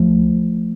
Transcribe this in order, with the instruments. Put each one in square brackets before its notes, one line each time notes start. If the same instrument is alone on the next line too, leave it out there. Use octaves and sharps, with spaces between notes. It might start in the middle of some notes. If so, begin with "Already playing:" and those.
Already playing: [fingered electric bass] C#2 F3 A3